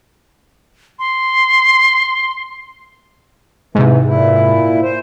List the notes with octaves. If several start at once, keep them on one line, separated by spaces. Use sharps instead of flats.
C6
G#2 C3 E3
A#2 E4
C5